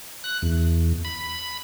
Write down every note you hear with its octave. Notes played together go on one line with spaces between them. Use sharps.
F#6
E2
B5